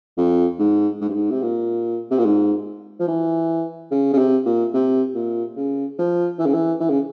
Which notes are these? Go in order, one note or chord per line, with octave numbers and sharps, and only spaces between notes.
F2
G#2
G#2
G2
G#2
C3
A#2
C3
A#2
G#2
F3
E3
C#3
C#3
C3
A#2
C3
A#2
C#3
F3
E3
C#3
E3
E3
C#3